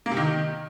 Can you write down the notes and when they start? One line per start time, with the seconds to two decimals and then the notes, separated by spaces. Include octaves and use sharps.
0.06 A#3
0.11 C3
0.17 D#3